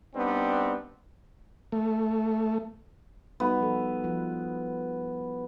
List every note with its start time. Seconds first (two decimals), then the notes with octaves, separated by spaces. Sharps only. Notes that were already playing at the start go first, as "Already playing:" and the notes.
0.16 G3 B3 C4 D4 D#4
1.72 A3
3.40 G3 B3 D#4 F#4
3.60 F3 A4
4.04 F3 F4 B4